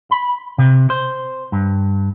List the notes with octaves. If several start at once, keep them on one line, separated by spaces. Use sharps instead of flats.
B5
C3
C5
G2